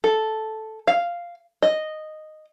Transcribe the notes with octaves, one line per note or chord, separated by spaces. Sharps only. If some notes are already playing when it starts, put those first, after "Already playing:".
A4
F5
D#5